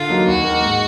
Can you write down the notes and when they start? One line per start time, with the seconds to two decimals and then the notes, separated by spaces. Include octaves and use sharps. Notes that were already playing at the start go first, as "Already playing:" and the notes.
Already playing: D3 F4
0.10 F#3 A#3 D#4 F#4
0.27 D#2 F#4
0.44 D#3 A#3
0.62 G#2